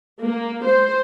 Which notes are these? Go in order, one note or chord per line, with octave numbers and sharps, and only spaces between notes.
A#3
C5